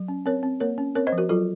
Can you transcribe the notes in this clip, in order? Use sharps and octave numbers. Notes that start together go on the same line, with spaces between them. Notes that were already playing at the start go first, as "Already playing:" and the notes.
Already playing: F#3
C#4
C4 A#4 C#5
C4
A#3 A#4 C#5
C#4
C4 A#4 C#5
C5 D#5
F3
F#4 A#4
F#3 F4 A4